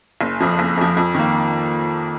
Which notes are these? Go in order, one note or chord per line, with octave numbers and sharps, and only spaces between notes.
F#1
F2 F3
F#1
F2 F3
F2
D#3 A#3